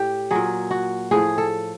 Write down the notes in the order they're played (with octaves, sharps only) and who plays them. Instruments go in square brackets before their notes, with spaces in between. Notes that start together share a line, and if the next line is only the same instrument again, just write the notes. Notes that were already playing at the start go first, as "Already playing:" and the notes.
Already playing: [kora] A2 G4
A#2 F#3 G#4
F#4
A2 F3 G#4
A4